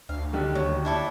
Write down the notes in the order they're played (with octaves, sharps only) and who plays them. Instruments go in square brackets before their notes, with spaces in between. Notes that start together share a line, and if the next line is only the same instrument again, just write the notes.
[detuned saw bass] D2 [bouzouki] F5
[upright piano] D3 D#3 G4
[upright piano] D#2 [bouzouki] F#3
[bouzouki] D4 E4 A4